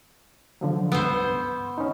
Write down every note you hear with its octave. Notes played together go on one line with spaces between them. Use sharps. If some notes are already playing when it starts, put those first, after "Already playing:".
D3 F3 F#3
C#2 G2 B3 C5 E6
C#4 D#4